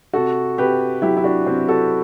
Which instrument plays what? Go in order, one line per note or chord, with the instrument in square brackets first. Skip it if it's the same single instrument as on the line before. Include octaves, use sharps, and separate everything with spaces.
[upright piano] C3 F#4 A4
C3 G4 B4
F#3 E4 G4
E4
D4 F#4
C3 C4
F#4 A4